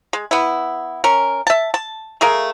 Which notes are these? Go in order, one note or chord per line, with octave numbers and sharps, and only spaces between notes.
G#3
B3 E4
C#4 A#4
E5 A5
A5
A3 G#4 A#4 F5